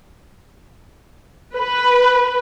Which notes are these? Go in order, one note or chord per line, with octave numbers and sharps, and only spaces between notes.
B4